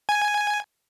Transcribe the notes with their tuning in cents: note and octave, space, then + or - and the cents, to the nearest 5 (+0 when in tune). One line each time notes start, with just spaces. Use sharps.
G#5 +0